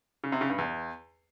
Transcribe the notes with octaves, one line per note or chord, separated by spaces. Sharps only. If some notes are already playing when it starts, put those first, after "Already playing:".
C#3
C3
C#3
G2
E2